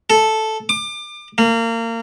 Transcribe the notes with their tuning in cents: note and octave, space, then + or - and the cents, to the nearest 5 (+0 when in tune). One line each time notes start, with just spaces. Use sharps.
A4 -5
D6 +30
A#3 -30